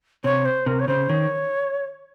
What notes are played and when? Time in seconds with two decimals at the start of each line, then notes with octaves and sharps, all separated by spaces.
0.24 C3 C#5
0.45 C5
0.66 C3 A#4
0.79 C#5
0.87 C#3 C5
1.09 D#3 C#5